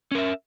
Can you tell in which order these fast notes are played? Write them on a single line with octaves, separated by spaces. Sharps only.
C#4 A#4 E5